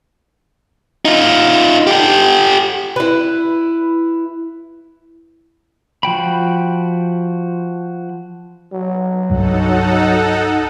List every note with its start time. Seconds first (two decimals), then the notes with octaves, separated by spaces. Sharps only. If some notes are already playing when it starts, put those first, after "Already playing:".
1.05 D#4 F4
1.87 G4 A4
2.96 E4 B4
6.03 F3 F#4 G5 B5
8.73 F#3
9.30 C2 G2 G3 D#4 A4 F#5